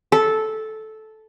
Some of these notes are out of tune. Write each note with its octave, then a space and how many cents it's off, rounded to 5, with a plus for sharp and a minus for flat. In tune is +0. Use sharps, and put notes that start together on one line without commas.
A4 -10